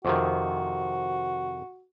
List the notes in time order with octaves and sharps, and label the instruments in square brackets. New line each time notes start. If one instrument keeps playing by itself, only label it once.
[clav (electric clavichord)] F2 C3 D#3 [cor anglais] F#4